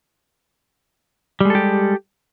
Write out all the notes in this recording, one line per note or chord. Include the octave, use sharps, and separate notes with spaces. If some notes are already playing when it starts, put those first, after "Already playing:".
G3 G#3 G4 A4